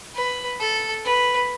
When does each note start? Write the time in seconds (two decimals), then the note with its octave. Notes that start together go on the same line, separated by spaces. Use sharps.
0.15 B4
0.60 A4
1.05 B4